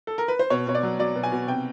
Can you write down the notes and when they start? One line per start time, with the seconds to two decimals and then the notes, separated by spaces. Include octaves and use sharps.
0.07 A4
0.18 A#4
0.28 B4
0.39 C5
0.50 B2 C#5
0.67 B2 C#5
0.75 D5
0.83 F#3
0.99 F#3 D5
1.15 B2
1.23 G#5
1.32 B2
1.47 C3 G5